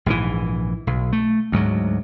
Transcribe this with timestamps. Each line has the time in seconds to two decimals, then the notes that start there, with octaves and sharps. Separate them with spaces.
0.06 A#1 G#2 D3 E3
0.87 B1
1.13 A3
1.52 D2 G#2 F#3